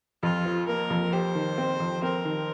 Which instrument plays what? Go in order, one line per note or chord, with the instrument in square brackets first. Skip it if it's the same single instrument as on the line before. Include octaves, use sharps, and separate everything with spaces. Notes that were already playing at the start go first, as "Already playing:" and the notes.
[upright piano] F2 [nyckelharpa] F4
[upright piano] F3
[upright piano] A#3 [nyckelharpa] A#4
[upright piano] F2
[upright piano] G4 [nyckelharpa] C5
[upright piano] D#3
C4
F2
[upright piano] C4 [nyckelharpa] A#4
[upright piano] D#3